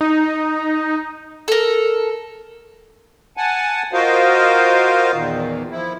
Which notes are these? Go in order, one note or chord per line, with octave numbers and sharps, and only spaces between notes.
D#4
A4 A#4
F#5 G#5 A5
F4 F#4 A#4 C5 D#5 F5
E2 A#2 D#3
F3 E4